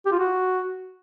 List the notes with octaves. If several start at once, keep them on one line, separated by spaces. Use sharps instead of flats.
G4
F4
F#4